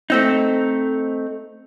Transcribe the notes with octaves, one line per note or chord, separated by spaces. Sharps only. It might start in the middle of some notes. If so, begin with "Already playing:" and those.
A3 C4 D#4